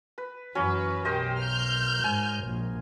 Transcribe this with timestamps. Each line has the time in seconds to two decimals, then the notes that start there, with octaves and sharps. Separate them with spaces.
0.18 B4
0.55 F#2 E3 F#3 C#4 B4 C#5
1.05 B1 G4 A#4 C5 D#5
1.41 F6 G6
2.04 G#2 G#5
2.44 A#1